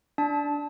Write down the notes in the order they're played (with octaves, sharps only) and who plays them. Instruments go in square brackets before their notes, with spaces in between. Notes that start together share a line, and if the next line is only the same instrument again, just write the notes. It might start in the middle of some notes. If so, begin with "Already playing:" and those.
[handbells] D4 A5